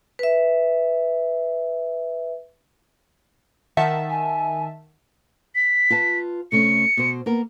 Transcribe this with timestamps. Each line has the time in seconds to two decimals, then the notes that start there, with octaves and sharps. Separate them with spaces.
0.19 B4 E5
3.77 D#3 E5 F#5 A5
4.10 G#5
5.55 B6
5.90 F4 B4 A5
6.52 C3 A3 C#4 C#7
6.97 B2 C5
7.26 A#3 B3 A#4